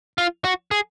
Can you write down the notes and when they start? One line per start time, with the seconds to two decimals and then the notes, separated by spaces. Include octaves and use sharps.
0.18 F4
0.44 F#4
0.71 G#4